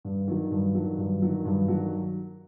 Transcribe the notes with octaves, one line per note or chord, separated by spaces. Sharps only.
G2
D#3 F#3
G2
D#3 F#3
G2
D#3 F#3
G2
D#3 F#3